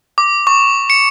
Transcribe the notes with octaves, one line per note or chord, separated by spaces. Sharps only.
D6
C#6
C#7